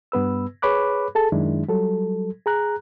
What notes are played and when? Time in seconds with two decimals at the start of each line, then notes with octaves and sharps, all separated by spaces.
0.12 G2 B3 B4 E6
0.62 G#4 B4 C#5 B5 D6 F#6
1.15 G#4 A4 A5
1.32 F#2 D#3 G#3 D4 E4
1.68 F#3 G3 A4
2.46 G#4 A#5 F#6